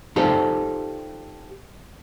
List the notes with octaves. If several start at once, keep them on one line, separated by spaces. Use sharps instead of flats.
D#4 F4 G4 A4 C5 D5